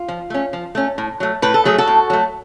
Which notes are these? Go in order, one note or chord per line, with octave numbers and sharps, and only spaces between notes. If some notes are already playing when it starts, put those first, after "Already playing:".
Already playing: F4
F3
A3 C#4
F3
A3 C#4
A2
F#3 A3
A2 B4
A4
F#3 A3 G#4
F#4 A4
A2
F#3 A3